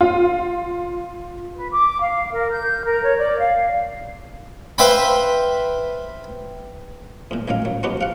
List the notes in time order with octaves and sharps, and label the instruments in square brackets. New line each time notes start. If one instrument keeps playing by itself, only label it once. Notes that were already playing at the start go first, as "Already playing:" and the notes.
[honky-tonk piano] F4
[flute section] B4
D6
F5
A#4
G6
A#4
C#5
D5
F5
[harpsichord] B4 C5 E5 F5 G5 B5
E2 A#2
A1 D#3 F#3 F5
F#3
F3 F#3 B3 D#4 F#4 G4
F5 F#5